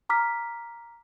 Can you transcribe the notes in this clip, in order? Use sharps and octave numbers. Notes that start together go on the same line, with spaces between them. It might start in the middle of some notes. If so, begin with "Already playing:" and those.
A#5 D6 F6 B6